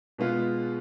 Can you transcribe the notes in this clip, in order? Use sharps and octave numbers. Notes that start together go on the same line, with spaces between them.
B2 G#3 B3 F4 G#4